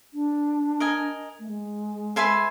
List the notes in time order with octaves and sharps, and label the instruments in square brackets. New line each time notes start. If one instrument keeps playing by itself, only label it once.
[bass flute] D4
[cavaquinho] A#4 D#5 G#5
[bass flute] A3
G#3
[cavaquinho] B4 E5 G#5 C6